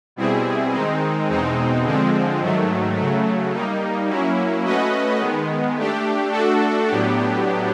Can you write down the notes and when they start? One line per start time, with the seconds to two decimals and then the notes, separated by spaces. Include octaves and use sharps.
0.16 B2 G3 C4 E4 G#4
0.72 D#3 G#3 C4 D#4
1.29 E2 B2 G#3 C4 D#4
1.85 D3 F3 G#3 C4
2.40 G#2 D#3 F#3 A3
2.97 C#3 F#3 A3
3.52 G3 A#3 D#4
4.09 F#3 A#3 C#4 E4
4.65 A3 C#4 F#4 B4 D#5
5.20 D#3 G#3 B3
5.76 A3 D4 G4
6.32 A3 D4 F#4 A4
6.88 A2 F#3 B3 D4 G4